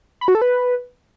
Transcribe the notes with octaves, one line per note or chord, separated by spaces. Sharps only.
B5
F#4
A4
B4